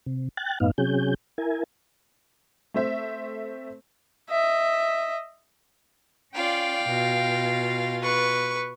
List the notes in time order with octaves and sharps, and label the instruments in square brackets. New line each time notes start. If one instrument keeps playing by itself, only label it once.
[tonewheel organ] C3
G5 F#6 A6
F#2 A2 B3 D#4 F5
C3 F#3 C#4 G#4 G6
E4 A#4 G#5
[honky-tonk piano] A3 C4 C5 E5
[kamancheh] D#5 E5
[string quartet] C#4 F4 D5 [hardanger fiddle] F5 G5
[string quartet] B2 F4
[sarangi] B4 [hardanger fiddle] C#6